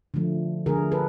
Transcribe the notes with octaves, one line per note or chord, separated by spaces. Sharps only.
D3 F3 A3
D3 F3 A3 G#4 A#4
A4 B4